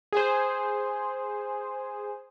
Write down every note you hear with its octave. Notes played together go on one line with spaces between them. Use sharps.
G#4 C5